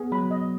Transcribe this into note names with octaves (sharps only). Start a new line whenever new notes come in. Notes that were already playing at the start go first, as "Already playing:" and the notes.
Already playing: B3 G#4
F#3 B5
G#3
D#5